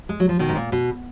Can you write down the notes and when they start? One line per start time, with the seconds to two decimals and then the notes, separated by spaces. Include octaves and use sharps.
0.09 G#3
0.20 F#3
0.29 F3
0.39 B2 D#3
0.49 G#2
0.55 A#2
0.72 B2